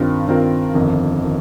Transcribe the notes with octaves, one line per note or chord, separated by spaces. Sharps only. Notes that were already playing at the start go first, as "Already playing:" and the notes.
Already playing: G2 D#3 C4 F4 A#4
G2 D#3 C4 F4 A#4
G1 F2 D#3
D#3